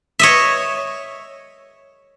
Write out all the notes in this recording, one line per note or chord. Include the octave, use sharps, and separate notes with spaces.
C#5 D#5 E5